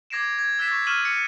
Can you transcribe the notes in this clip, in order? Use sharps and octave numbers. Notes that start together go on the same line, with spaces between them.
D6 G#6 A#6 C7 D7 E7
G#6
E6 F#6 G#6 A6 B6 E7
C#6 G#6
C#6 F6 G#6 D#7 E7 F#7
C#7